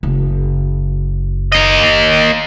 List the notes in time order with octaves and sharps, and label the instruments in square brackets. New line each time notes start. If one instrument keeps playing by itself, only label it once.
[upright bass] F#1
[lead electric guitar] A#3 D#5